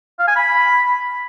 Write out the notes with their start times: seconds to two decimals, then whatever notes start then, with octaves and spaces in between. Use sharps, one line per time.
0.19 F5
0.27 G#5
0.36 B5